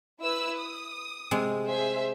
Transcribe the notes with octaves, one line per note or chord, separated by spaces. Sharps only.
E4 B4 E6
D#6
C3 G#3
G#4 C5 E5